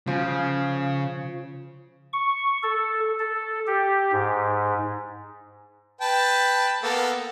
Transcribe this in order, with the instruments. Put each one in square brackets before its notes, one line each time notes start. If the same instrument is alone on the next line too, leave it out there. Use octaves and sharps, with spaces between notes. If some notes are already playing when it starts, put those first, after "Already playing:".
[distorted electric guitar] C#3 [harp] F3
[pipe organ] C#6
A4
A4
G4
G#2
[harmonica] B4 G5 A5
A#3 B3 A4